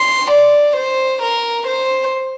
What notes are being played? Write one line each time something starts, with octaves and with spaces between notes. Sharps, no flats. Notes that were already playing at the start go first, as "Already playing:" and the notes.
Already playing: C6
D5
C5
A#4
C5